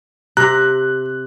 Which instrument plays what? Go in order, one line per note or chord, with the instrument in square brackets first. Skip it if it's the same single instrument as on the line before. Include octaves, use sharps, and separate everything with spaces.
[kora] C3 [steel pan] A#5 [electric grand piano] F#6